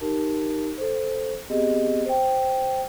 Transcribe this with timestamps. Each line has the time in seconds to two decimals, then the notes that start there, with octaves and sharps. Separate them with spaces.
0.01 D#4 G4 A#4 A5
0.78 A4 C5
1.50 B3 C4 G4 G#4 D#5
2.05 C5 G5